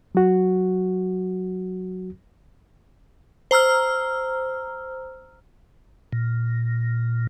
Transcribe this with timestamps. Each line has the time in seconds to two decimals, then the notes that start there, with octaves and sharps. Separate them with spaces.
0.15 F#3 F#4
3.51 C5 A#5 E6 F6
6.13 A#2